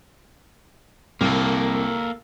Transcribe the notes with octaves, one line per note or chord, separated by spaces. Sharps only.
C2 A#3 A4